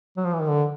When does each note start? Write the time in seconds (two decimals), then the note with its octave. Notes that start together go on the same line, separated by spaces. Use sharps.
0.17 F#3
0.25 F3
0.33 E3
0.41 D#3
0.49 D3